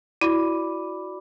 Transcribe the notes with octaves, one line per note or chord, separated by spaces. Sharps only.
E4 F#4 D5 B5 D6